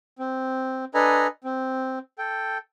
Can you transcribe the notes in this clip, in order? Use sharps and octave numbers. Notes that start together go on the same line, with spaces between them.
C4
D4 A4 B4 D#5 G#5 A#5
C4
A4 G5